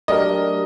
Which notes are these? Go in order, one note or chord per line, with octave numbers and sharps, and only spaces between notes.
F#3 A3 D4 G4 A#4 D#5